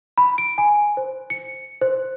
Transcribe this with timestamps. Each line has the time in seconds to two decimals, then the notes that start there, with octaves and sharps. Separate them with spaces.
0.18 B5
0.38 D7
0.58 G#5
0.97 C5
1.30 C#7
1.81 C5